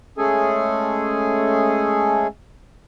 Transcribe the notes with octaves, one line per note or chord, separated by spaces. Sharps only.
G#3 A3 C#4 G#4 A4 G#5